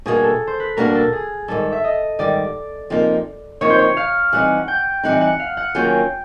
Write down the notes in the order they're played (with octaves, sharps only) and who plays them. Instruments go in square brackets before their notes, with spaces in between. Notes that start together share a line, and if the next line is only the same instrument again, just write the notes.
[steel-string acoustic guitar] B2 G3 A#3 D4 [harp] G#4
[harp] A4
C5
B4
[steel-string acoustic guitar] B2 G3 A#3 D4 [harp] A#4
[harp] A4
G#4
[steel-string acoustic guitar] G#2 D#3 G3 [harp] A4
[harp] E5
D#5
[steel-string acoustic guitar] G#2 D#3 G3 [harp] D5
[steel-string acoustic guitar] C3 F3 A#3 D#4
[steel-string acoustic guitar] C3 F3 A#3 D#4 [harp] C#5
[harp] C5
C#5
F5
[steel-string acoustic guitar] E3 G3 C4 D#4 [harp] F#5
[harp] G5
[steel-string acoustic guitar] E3 G3 C4 D#4 [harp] F#5
[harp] F#5
F5
F#5
[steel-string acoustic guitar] D#3 F#3 A#3 C#4 F4 [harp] G5